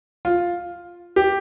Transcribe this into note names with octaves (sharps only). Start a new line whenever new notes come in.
F4
G4